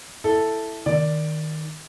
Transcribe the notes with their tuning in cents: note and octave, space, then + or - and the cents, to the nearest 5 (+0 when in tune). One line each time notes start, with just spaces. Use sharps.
E4 +0 A4 +0
D#3 +0 D5 +0